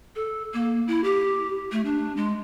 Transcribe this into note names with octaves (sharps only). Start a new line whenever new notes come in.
A4
A#3
E4
G4
A3
D4
G#3